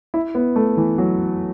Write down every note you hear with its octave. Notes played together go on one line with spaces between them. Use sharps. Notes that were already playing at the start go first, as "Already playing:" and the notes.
E4
B3
A3
E3
F#3